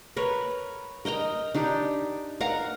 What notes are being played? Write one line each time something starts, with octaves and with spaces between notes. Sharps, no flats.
A#4 B4 C#5
A#4 D#5 G5 A#5
D4 D#4 G4
A#4 F5 F#5 A#5